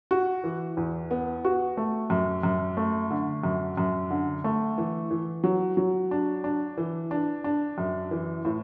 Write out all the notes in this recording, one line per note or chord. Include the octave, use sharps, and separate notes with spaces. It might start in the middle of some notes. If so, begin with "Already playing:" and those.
F#4
E3
E2
B3
F#4
A3
F#2
F#2
A3
D3
F#2
F#2
D3
A3
E3
E3
F#3
F#3
D4
D4
E3
D4
D4
F#2
E3
A2